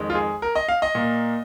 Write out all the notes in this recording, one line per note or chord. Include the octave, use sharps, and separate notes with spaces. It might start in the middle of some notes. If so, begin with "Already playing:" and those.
Already playing: F2 D#3 G#3
F4
G#4
A#4
D#5
F5
D#5
A#2 A#3